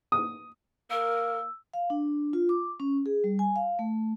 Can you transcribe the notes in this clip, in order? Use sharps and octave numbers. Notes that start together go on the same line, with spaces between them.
D#6
A#3 A#4 E6
F5
D4
F4
D6
C#4
G#4
G3
G#5
F5
A3